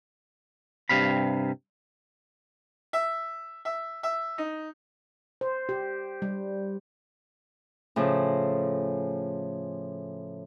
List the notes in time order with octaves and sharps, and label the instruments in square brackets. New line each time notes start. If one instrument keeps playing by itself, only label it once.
[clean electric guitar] G2 C3 F5 B5
[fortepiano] E5
E5
E5
D#4
[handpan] C5
G4
G3
[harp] A2 C#3 F3